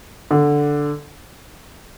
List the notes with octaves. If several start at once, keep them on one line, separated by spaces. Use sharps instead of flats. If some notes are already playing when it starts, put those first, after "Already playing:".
D3